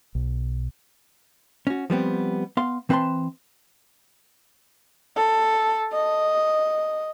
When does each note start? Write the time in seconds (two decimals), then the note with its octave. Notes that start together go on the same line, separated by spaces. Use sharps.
0.15 B1
1.67 C#4 F#4
1.90 F3 G3 B3 C4
2.57 B3 F5 C6
2.89 E3 C4 B4 D#5 A5 C6
5.16 A4
5.92 D#5